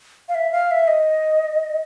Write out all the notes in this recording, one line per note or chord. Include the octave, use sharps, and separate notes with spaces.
F5
E5
F5
E5
D#5